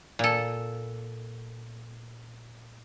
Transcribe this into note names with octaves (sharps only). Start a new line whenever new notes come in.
A#2 A4